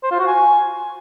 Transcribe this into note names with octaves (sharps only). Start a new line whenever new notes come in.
C5
F4
F#4
G#5